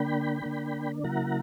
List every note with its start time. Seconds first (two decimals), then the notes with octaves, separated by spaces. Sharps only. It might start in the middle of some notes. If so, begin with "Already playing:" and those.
Already playing: D3 A#3 D4 G5 B5
0.42 D3 A#3 D4
1.04 C#3 F#3 A#3 E4 F#5 A#5